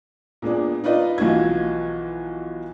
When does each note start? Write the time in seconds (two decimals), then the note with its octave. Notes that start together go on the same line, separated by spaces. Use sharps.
0.42 A#2 G#3 B3 D4
0.84 D#4 F4 B4 D5 D#5
1.18 B1 E3 F3 F4 F#4 G#6